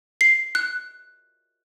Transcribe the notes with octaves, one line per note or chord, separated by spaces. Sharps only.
C7
F#6